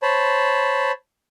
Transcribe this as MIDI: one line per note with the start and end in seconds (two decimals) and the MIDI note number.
0.02 0.92 72
0.02 0.92 73
0.02 0.92 81
0.02 0.92 83